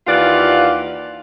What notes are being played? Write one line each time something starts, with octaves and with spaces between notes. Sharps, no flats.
D#2 E3 F4 D5 F5 F#5